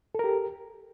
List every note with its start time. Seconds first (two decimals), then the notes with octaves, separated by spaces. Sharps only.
0.15 A4
0.19 A#4
0.24 G4